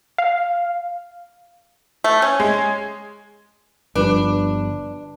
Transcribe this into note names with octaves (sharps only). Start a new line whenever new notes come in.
F5
A3
C#4
G#3
G1 F3 G3 D4 B4